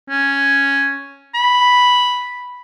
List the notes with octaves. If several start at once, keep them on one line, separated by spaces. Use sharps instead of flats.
C#4
B5